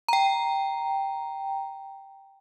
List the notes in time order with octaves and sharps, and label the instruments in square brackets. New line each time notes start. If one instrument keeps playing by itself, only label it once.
[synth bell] G5 A#5